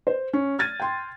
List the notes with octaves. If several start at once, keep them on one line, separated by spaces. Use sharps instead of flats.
C5
C#4
F6 G#6 A6 D#7
G5 C6